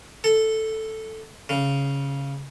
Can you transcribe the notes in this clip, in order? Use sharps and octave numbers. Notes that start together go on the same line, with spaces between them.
A4
C#3